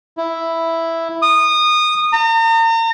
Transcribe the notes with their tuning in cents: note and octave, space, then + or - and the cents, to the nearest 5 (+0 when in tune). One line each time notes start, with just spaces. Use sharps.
E4 +0
D#6 -20
A#5 -40